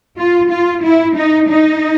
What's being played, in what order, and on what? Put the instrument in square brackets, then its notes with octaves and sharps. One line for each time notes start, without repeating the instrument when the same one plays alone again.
[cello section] F4
F4
E4
D#4
D#4